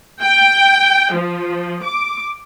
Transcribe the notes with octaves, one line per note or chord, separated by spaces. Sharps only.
G5
F3
D6